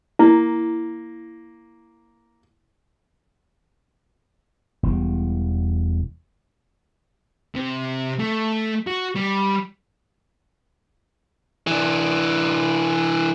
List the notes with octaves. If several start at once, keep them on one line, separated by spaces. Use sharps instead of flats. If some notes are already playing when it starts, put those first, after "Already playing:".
A#3 E4
E1 E2 G3
C3
A3
F#4
G3
E3 D4